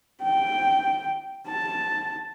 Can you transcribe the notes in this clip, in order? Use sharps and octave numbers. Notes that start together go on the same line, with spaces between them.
G5
A5